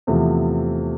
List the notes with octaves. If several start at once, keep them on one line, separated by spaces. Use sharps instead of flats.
E2 C3 F3 A3